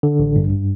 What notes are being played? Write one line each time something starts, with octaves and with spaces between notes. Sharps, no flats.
D3
A1
G2